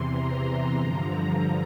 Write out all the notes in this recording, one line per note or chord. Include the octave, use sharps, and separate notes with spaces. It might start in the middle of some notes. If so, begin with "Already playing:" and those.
Already playing: E2 C3 E3 C6
A#5
G2 D3 F3